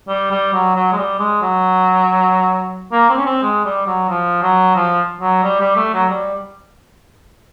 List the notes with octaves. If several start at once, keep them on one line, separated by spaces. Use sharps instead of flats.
G3
G3
F#3
F#3
G#3
G3
G#3
F#3
A#3
C4
C#4
C4
G#3
G3
F#3
F3
F#3
F3
F#3
G3
G3
A3
F#3
G3